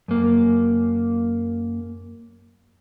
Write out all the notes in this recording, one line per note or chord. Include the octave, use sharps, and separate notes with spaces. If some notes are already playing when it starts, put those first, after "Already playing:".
F#2 A#3